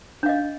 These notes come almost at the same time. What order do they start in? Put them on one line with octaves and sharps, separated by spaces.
D4 F5 D#5